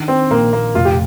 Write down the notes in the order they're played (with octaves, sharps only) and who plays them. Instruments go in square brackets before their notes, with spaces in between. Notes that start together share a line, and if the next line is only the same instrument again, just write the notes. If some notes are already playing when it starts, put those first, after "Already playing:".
Already playing: [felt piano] D#3 D4
[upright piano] C4
[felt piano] A#1 [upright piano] A#3
[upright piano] A#3
[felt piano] F1 [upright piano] F4
[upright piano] G4